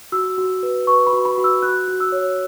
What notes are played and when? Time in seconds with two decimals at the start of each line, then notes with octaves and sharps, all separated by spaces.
0.12 F#4 E6
0.38 F#4
0.63 B4
0.87 B4 C#6
1.07 B5
1.13 F#4
1.25 B5
1.38 F#4
1.44 E6
1.62 F#4 F#6
1.88 F#4
2.00 E6
2.12 C#5